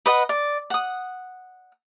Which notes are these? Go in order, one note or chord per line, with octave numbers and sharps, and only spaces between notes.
B4 D#5 F#5
D5
F#5 D#6